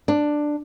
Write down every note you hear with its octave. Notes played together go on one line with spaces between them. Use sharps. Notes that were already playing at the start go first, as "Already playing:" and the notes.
D4